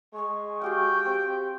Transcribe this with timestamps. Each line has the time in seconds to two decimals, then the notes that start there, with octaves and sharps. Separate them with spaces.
0.14 G#3 C#6
0.62 F#4 G4 F5 G5
1.05 C4 G4